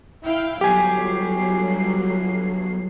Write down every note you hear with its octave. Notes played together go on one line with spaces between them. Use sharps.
E4 F5 G5
G1 F#3 G4 G#5 C7